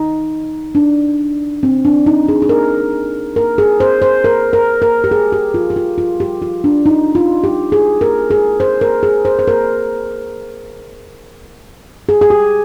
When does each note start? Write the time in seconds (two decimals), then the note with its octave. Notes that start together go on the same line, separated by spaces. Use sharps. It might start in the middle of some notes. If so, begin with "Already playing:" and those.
Already playing: D#4
0.75 D4
1.63 C4
1.85 D4
2.06 D#4
2.29 G#4
2.42 G#4
2.49 A#4
3.36 A#4
3.58 G#4
3.80 C5
4.02 C5
4.24 A#4
4.53 A#4
4.82 A#4
5.04 G4
5.11 G#4
5.32 G4
5.54 F4
5.70 G4
5.76 F4
5.98 F4
6.20 G4
6.42 F4
6.64 D4
6.86 D#4
7.15 F4
7.44 G4
7.72 G#4
8.01 A#4
8.31 G#4
8.60 C5
8.81 A#4
9.03 G#4
9.25 C5
9.39 C5
9.48 A#4
12.09 G#4
12.21 G#4
12.30 G4